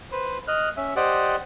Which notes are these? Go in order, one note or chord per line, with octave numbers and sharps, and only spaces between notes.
B4 C5
D#5 F6 F#6
C#4 E5
G4 C5 D5 D#5 F#5 G5